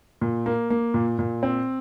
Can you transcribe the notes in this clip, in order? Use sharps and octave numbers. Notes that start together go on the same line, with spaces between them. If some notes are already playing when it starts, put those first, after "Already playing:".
A#2
A#3
A#3
A#2
A#2
C4